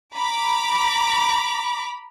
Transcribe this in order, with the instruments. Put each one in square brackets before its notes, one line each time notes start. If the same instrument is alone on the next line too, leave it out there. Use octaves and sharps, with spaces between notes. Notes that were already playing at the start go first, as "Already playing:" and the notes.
[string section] A#5 B5 D6